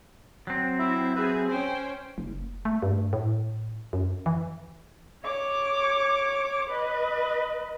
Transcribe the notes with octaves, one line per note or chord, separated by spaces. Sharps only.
F#3 C4
E4 E5
G#4 B4 E5
C#4 C5 G5 G#5
F#1
A3
G2
A2
F#2
E3
C#5 D6
B4 D#5